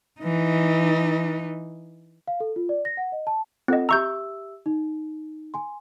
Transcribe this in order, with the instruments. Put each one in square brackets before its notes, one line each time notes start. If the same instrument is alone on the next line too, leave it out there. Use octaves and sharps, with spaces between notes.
[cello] E3 D#4
[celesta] F5
A4
F4
D5
A#6
F#5
D#5
A5
[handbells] C4 D#5 [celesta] F4 A4 F#5
[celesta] G4 E5 E6 [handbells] A#5 C#6 G6
[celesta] D#4
G#5 C6